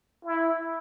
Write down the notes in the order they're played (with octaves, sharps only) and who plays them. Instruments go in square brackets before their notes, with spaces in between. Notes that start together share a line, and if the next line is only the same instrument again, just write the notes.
[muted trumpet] E4